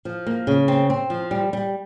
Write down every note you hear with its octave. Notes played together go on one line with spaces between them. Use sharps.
F3
A#3
C#3
C4
C4
F3
G3
G3